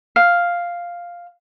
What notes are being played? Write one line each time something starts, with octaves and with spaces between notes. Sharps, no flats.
F5